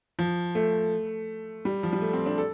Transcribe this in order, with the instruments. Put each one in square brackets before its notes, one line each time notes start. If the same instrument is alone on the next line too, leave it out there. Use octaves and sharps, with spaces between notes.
[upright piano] F3
A3
G3
F3
G3
A3
C4
D4
A4